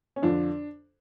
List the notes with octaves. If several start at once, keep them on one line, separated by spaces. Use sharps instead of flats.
C#4
F2 D3 F3 D4